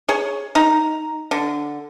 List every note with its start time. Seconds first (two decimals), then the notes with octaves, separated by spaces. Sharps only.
0.09 G#4 C#5
0.55 D#4 A#5
1.31 D3